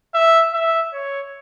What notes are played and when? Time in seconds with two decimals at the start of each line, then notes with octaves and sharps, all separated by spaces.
0.14 E5
0.53 E5
0.93 C#5